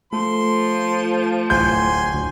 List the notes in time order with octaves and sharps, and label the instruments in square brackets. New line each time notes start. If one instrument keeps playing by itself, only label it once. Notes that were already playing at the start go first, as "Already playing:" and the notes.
[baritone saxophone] F3 [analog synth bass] A3 [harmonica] C6
[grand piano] D1 G6 [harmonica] G#5 C6
[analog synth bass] D2